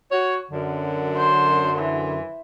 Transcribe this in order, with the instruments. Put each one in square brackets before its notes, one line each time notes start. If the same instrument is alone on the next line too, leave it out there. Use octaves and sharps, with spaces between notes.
[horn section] F#4 C#5
F#2 D3
[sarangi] C5
E3